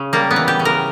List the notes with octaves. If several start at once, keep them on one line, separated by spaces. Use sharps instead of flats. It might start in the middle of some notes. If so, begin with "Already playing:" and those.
Already playing: C#3
G3 A#3
B3
E3
G4
C#3
A#4